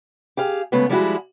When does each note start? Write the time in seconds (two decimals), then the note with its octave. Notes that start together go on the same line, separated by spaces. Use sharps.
0.37 G4 G#4 F5
0.72 C#3 G#3 A3 B3
0.89 F3 G3 G#3 B3 E4 F#4